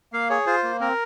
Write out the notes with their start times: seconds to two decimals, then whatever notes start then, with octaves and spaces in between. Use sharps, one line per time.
0.13 A#3 F5
0.30 G#4 C#5
0.46 F4 C5
0.63 A#3
0.80 C4 A#4